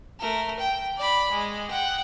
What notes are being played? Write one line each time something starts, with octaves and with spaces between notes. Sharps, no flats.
A3 A#4
G5
D5 B5
G#3
F#5 G5